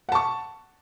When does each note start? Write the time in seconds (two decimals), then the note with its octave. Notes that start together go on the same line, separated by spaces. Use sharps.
0.09 F#5
0.12 A5
0.15 C#6